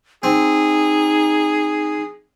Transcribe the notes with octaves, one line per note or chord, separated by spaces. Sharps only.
C4 D#4 G#4